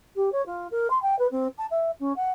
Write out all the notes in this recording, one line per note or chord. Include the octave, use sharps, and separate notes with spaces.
G4
C#5
F4
A#4
C6
G5
B4
C4
A5
E5
C#4
F#5